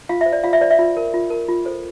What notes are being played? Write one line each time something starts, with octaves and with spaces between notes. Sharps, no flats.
F4 F5
E5
C5
D5
F4 F5
E5
C5 D5
E5
F4
A#4
F4
A#4
F4
A4 C5